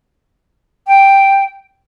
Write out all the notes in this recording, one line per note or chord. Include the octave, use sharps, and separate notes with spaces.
G5